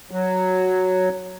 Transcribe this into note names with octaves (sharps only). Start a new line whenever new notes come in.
F#3